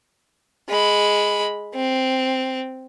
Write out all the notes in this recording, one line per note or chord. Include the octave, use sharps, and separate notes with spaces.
G#3 B5
C4